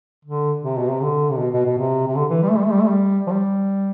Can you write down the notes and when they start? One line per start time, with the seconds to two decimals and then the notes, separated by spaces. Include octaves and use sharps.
0.25 D3
0.63 C3
0.78 B2
0.90 C3
1.02 D3
1.31 C3
1.40 B2
1.53 B2
1.65 B2
1.79 C3
2.08 C3
2.16 D3
2.30 E3
2.43 G3
2.50 A3
2.58 G3
2.65 A3
2.72 G3
2.81 A3
2.88 G3
3.27 F3
3.31 G3